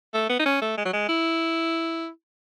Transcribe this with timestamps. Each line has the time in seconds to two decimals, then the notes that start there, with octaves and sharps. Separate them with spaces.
0.14 A3
0.29 B3
0.39 D#4
0.46 C#4
0.62 A3
0.78 G#3
0.85 F#3
0.93 G#3
1.08 E4